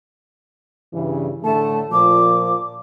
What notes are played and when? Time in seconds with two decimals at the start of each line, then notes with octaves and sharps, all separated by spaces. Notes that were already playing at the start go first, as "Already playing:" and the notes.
0.94 G2 C#3 E3
1.44 A2 D3 A3 A5
1.92 A#2 F3 D6